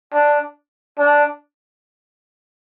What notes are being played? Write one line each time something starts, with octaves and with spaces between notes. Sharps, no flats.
D4
D4